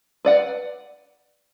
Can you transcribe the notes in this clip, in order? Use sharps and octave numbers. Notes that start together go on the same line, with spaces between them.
B4 D5 F#5